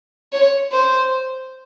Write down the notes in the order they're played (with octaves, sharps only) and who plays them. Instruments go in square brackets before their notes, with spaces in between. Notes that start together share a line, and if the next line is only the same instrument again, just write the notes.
[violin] C#5
C5